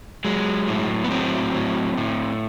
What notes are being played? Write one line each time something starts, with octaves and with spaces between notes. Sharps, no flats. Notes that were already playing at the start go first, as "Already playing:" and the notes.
F#3 G#3
A2
B3
F#3 C4
A2
A2